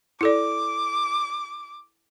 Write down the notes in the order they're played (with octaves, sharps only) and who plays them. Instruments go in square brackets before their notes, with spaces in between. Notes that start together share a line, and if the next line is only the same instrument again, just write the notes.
[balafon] E4 A4 D5 [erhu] D6